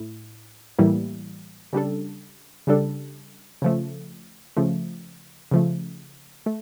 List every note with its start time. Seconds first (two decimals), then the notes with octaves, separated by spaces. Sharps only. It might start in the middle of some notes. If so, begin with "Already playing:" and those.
Already playing: A2 E4
0.79 A2 E3 G3 A#3 E4
1.73 C#3 G3 D4 A4
2.67 C#3 G3 D4 A4
3.62 C#3 F3 A3
4.57 C#3 F3 A3
5.51 C#3 F3 A3
6.46 A3